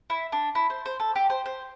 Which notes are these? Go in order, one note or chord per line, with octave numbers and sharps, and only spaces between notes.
E4
D4
E4
C5
C5
A4
G4
C5
C5